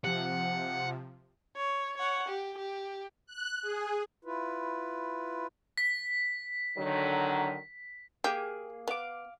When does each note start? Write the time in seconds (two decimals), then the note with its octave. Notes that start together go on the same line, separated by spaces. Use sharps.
0.04 C3 F3 F#5
1.57 C#5
1.98 C#5 F#5
2.29 G4
2.58 G4
3.26 F#6
3.62 G#4
4.25 E4 F4 B4
5.78 B6
6.78 D3 D#3 F#3
8.24 A#3 G4 G#4
8.88 B3 F5 D6